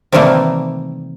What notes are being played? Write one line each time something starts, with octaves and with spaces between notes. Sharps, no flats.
C3 D#3 E3 G3 A3 A#3